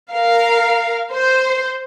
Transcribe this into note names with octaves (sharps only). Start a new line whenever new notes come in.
A#4 F5
C5